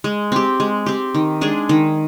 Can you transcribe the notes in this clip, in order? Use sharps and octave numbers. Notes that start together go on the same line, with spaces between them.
G#3
C4 G4
G#3
C4 G4
D#3
G#3 D4 G#4
D#3